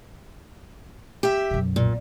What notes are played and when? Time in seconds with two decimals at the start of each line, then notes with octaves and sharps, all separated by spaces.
1.23 G4 E5
1.51 B1 F#2
1.76 A#2